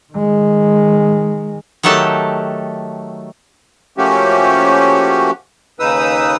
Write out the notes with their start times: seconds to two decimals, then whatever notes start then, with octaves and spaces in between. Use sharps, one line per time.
0.13 D#3 G#3
1.83 D#3 F#3 A3 G4 A4 A5
3.98 F3 A3 A#3 C#4 F#4 G4
5.80 D#2 C#3 D#4 B4 D#6 E6